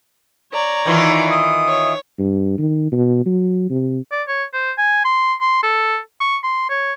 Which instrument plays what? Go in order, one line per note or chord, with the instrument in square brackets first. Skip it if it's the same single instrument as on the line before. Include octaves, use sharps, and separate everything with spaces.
[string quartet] C#5 D5 A#5
[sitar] D#3 E3 F4
[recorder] D#6
[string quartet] C#5
[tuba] G2
D#3
B2
F#3
C3
[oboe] D5
C#5
C5
G#5
C6
C6
A4
C#6
C6
C#5